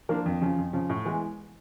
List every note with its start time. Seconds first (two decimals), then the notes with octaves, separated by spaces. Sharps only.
0.09 F3 A#3 D4 F4
0.26 F2
0.41 C#3 F3
0.58 F2
0.73 C#3 F3
0.90 A2
1.05 E3 G#3 B3